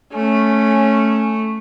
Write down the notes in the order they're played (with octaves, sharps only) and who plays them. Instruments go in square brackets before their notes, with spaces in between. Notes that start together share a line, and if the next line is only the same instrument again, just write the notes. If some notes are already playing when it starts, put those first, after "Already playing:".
[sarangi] A3 [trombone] C#4